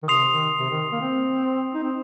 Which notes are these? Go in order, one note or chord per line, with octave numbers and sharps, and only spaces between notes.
D#3
C3 C6 D#6 C7 F7
D#3
C3
D#3
A#3
C4
D#4
C4